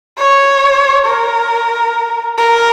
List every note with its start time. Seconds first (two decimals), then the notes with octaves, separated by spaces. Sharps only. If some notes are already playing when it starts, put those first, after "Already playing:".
0.18 C#5
1.06 A#4
2.38 A#4